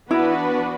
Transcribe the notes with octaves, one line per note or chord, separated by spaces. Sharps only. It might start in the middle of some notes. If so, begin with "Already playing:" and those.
E3 B3 D4 E4 F#4 B4